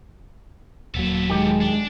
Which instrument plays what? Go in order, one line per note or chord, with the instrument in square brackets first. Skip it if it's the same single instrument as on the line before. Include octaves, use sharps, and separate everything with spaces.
[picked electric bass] D#1 F#3 [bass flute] A#3 [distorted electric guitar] B3 A4
[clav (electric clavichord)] D#3 G4 [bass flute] G#3
[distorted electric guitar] D4